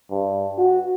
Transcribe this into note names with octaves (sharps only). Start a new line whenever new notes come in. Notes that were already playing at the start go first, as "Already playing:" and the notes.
G2
F#4